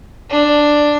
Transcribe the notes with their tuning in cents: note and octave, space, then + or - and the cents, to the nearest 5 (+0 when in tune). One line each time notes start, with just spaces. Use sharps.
D4 +5